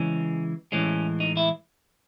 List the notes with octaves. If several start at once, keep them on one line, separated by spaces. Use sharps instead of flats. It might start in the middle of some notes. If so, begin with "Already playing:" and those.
Already playing: C#3 E3 G#3 C#4
A2 E3 G#3 C#4
D#4
E4